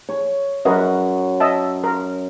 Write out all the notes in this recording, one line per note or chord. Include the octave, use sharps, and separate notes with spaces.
C#5
F#2 A#4 B4 D#5 F#5 C#6
D#5 E5 A5
A#4